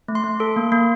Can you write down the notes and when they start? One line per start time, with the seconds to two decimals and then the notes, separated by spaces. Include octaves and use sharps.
0.08 A3
0.15 C6
0.24 A3
0.40 A4
0.56 A#3
0.72 A#3